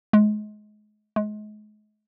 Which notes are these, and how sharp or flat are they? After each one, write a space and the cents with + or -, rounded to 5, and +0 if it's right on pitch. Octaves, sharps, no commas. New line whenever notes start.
G#3 +30
G#3 +35